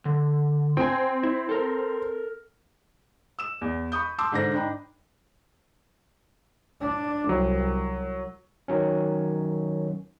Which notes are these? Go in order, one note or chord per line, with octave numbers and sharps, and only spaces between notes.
D3
C4 G5 G#5
E4
A4 A#4
E6 E7
E2
B5 C#6 D#6 G6
A5 C6 D6 E6
G#2 D3 D4 C5 A#6
D4 D#4 G5 B5
D4
C2 F#3
D#3 F#3 C#4